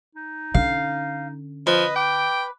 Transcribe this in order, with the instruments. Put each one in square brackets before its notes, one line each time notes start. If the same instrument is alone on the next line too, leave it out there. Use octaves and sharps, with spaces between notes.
[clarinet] D#4
[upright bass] D3 C#4 [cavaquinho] F5
[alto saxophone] F3 [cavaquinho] B4 [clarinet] D#5
[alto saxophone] G5 [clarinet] D6